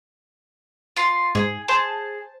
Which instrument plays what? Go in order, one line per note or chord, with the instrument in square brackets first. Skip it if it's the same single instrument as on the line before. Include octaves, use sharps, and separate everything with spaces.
[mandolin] F4 C6
[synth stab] G#2 [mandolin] G#4
[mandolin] G#4 [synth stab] C5 A5